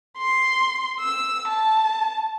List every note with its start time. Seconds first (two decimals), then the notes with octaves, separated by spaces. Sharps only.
0.18 C6
1.00 E6
1.48 A5